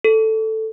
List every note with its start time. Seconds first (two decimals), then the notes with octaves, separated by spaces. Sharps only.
0.04 A4